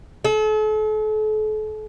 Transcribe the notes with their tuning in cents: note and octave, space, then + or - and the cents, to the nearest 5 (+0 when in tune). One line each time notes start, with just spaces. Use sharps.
A4 -40